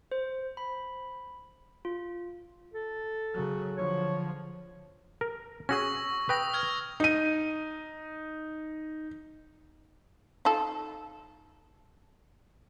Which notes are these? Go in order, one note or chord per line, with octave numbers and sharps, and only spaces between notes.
C5
B5
F4
A4
C#3 F#3
D3 F3 C#5
A#4
C#4 F#4 G#4 C#6 E6 A#6
B4 G5 D#6 A#6
F6 G#6
D#4 D#7
D#4 F4 A4